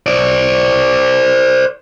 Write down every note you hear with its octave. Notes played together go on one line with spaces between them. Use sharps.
C5 D5